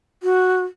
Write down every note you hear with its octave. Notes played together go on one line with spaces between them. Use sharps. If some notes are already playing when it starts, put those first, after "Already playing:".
F#4